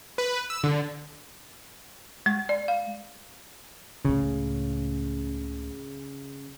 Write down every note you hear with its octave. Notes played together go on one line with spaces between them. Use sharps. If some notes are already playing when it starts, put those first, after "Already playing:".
B4
E6
D3
G#3
D5
F5
C#2 A2 C#3